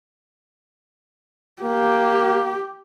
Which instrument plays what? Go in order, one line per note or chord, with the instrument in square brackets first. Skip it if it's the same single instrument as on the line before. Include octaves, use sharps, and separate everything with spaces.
[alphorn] A#3 [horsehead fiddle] G4